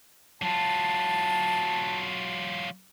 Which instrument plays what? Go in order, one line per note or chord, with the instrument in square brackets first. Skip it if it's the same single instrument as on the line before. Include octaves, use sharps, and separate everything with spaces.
[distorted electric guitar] F#3 F4 [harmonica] A5